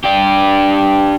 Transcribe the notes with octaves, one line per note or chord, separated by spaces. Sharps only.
D4 G4